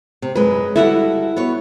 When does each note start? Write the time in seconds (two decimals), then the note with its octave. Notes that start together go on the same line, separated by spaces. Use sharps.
0.22 C3
0.35 F#2 G#3 B4
0.76 G3 E4 F#4 A4 E5 F#5
1.36 B3 F#4 C#5